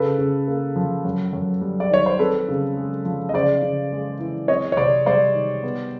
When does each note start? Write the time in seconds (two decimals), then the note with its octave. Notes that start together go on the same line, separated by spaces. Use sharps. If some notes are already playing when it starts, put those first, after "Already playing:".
Already playing: C#3 A4 B4
0.18 C#3
0.48 A#3
0.76 F3
1.05 F#2
1.33 F#2
1.61 G3
1.80 D5
1.91 D#3 C#5
2.06 C5
2.19 C4 A4 B4
2.48 C#3
2.76 G#3
3.05 F3
3.29 D#5
3.34 C#3 C5 D5
3.62 C#3
3.92 G#3
4.20 E3
4.48 C4 C#5 D#5
4.72 C#5
4.77 C3 C5 D5
5.06 G3 C5 D5
5.34 D#3
5.63 B3